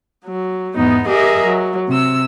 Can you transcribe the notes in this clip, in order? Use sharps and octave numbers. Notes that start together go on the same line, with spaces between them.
F#3
E2 G#2 B3 D#4
G4 G#4 A#4 D#5 E5
F#3
C3 E6